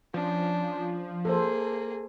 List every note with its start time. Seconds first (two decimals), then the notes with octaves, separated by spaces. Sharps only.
0.14 F3 C#4 D4
1.25 A#3 G#4 A4 C5